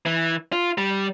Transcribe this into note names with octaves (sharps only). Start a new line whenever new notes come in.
E3
F4
G3